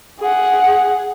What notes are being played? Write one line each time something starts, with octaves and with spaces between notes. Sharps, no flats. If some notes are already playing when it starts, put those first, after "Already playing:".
G#4 F#5